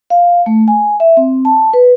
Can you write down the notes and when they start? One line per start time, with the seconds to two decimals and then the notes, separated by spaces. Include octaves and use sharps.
0.10 F5
0.46 A3
0.68 G#5
1.00 E5
1.17 C4
1.45 A5
1.73 B4